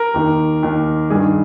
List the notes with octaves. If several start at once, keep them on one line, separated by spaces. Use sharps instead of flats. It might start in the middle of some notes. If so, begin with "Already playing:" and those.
Already playing: A#4
D#2 D#3
D#2 D#3
G2 D#3 G#4